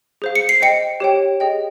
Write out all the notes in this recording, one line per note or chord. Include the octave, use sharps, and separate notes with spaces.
G#4 C5 F5
C#7
C7
C5 D#5 G5 C#7
G4 C#5 G5
G#4 D#5 G5